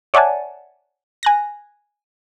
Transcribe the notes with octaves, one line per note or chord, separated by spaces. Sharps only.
C#5 D5 E5 F#5 G#5 A5
G#5 F#6 A#6